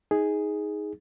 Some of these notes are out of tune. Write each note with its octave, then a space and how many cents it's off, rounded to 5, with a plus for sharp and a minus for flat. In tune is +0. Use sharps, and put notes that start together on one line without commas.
D#4 +20 G#4 +0